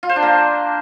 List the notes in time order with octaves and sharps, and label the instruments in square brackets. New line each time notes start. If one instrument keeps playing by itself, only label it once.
[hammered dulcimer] F4
C5
D4
A#3